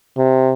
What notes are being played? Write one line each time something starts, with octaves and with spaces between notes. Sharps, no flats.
C3